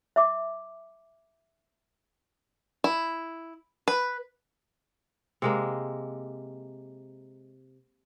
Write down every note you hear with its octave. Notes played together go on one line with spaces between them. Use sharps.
E5 D6
E4
B4
C3 G#3 A#3